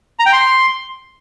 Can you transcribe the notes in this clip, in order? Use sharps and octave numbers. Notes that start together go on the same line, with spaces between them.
A#5
G5
C6